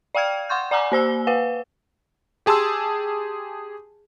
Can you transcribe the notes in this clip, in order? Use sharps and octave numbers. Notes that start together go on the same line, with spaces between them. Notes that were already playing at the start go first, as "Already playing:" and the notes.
D5 F5 G5 F6 G#6
F#5 C6 C#6 G6
D5 F#5 G#5 A#5 D6
A#3 C5 E6 G7
B4 F5 F#5
G4 G#4 A5 C6 E6